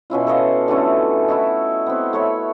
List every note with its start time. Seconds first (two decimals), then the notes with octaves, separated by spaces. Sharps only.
0.10 B2 C#4 E4 F4
0.27 A4 C#5 D#5 F5
0.68 D3 E3 A3 C#4
1.28 E4 F#4 D#5
1.86 B3 C4
2.13 A3 C#5 B5